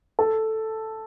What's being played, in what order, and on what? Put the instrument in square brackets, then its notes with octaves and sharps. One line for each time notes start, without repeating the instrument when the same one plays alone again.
[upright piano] A4